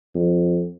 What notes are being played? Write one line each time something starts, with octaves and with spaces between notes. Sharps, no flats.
F2